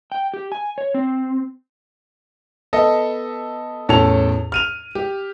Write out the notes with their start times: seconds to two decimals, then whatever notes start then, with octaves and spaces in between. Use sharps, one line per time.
0.12 G5
0.34 G4
0.52 G#5
0.78 C#5
0.94 C4
2.73 B3 A4 D#5 E5
3.89 E2 A2 C#4 A4 A5 F7
4.52 F6 D#7 F7
4.95 G4